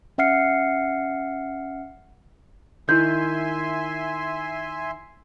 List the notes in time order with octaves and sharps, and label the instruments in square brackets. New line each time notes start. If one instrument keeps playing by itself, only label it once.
[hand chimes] C#4 E5 F#5 F6 C7 C#7
[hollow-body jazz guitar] D#3 [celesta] E4 G6 [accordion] E5 G#5 C6